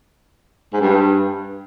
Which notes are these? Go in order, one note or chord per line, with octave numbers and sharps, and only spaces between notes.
G#2
G2